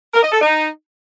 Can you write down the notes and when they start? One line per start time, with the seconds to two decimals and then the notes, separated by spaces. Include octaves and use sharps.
0.13 A#4
0.23 D#5
0.32 A4
0.41 D#4